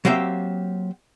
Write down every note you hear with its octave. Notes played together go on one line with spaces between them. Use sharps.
F#3 A#3 C4 G4 E5